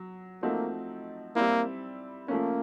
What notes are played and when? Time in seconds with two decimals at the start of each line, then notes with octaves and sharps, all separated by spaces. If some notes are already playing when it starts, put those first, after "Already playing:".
Already playing: F#3
0.42 F3 A3 A#3 C4 D#4 F#4
1.36 G3 A#3 C4 E4
2.28 F3 A3 A#3 C#4